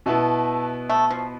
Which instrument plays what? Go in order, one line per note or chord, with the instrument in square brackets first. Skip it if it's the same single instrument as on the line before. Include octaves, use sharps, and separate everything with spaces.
[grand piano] B2 B3 E4 [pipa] A3
[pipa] A3
F3